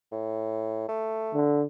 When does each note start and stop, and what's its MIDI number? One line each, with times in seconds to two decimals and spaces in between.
0.12 0.85 45
0.88 1.40 57
1.34 1.63 50